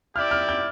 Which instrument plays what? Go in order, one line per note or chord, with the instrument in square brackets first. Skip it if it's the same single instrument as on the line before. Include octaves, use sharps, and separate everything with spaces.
[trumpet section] E4 G4 D5 [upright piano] F6
[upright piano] F6
G6